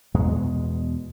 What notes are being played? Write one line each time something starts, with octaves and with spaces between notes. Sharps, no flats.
E2 B2 G#3